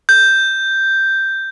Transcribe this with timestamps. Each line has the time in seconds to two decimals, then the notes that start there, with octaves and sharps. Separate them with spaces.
0.09 G6